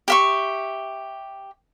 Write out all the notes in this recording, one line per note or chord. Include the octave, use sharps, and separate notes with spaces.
G4 E5 C#6